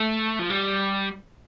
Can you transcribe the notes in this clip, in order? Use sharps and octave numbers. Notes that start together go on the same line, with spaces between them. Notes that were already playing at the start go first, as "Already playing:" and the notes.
Already playing: A3
F3
G3